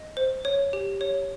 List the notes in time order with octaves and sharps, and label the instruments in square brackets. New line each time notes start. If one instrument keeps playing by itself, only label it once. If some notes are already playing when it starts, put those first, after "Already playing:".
Already playing: [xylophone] D#5
C5
C#5
G4
C#5